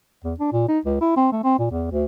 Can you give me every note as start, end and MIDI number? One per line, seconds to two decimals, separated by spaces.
0.24 0.34 40
0.40 0.50 62
0.52 0.67 46
0.68 0.79 63
0.85 0.97 37
1.01 1.12 64
1.16 1.29 60
1.32 1.40 57
1.44 1.58 60
1.59 1.68 46
1.70 1.90 40
1.91 2.05 38